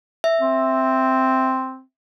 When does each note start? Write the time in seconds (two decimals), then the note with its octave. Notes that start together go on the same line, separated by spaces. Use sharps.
0.24 E5
0.42 C4